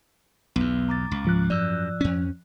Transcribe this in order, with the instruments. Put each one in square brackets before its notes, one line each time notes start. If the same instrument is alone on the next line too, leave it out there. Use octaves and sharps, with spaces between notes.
[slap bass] B1 E2 [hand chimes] B3
[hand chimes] A#5 D6 A6
[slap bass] C#2
[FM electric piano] G#2 F3 F#6
[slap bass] F#2 [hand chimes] D5 E6
[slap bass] F2 C#4